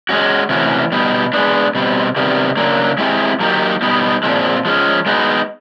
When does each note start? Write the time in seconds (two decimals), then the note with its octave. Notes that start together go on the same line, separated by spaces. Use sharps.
0.09 G#3 C#4 F#4
0.49 C3 E3 A3 C#4 F#4
0.92 B2 G3 B3 D#4
1.33 G#3 B3 D4
1.75 B2 G3 C4
2.16 C3 D#3 G3 B3
2.57 C#3 F#3 A#3 D4
2.98 G#3 C4 E4 G4
3.40 F#3 A#3 D#4 G4
3.82 B2 G3 B3 D#4
4.23 A#2 F3 G#3 C4
4.65 F3 G#3 C#4
5.06 G#3 B3 D#4 F#4